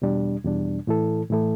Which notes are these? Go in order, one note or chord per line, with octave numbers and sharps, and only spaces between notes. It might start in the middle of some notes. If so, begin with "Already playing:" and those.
E2 B2 G3 D4
E2 B2 G3 D4
A2 E3 A3 E4 A4
A2 E3 A3 E4 A4